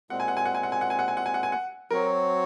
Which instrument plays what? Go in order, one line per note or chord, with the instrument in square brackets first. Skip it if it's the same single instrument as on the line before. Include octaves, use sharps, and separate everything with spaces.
[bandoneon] A#2 G#3 C4 [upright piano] F#5
[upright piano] G#5
F#5
G#5
F#5
G#5
F#5
G#5
F#5
G#5
F#5
G#5
F#5
G#5
F#5
G#5
F#5
[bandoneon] F#3 C4 F#4 C#5 [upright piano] A#4